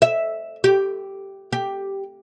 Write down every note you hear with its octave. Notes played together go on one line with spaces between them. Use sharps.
E5
G4
G4